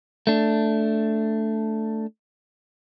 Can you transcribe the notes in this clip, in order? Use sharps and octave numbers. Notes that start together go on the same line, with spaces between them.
A3 D4